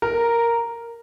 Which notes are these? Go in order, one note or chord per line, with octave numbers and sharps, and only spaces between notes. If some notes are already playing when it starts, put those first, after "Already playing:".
A#4